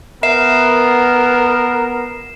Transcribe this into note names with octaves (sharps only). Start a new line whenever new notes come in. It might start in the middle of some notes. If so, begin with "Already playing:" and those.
B3 A#4 E5 C7 E7